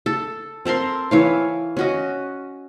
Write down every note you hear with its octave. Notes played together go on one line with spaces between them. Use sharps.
A4
C4 A4 A#4 C6
E3 C#5 F5
C#4 F#4 D#5